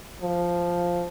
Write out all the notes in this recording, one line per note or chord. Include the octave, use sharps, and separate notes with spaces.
F3